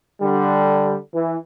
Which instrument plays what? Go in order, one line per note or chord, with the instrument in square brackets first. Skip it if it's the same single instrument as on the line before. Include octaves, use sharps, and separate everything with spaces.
[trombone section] D3 G3
E3